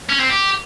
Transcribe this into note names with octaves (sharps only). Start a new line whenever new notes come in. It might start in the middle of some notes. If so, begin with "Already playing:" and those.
C#4
C4
G4